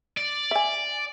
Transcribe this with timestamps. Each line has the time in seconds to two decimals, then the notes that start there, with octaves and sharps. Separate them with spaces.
0.17 D5
0.51 E5 G#5